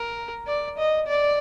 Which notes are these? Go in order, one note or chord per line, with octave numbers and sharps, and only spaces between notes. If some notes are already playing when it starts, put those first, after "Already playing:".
Already playing: A#4
D5
D#5
D5